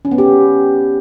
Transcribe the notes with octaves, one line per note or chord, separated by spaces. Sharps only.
C#4
B3
G4